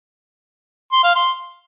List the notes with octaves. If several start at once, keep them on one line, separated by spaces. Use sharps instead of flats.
C6
F5
C6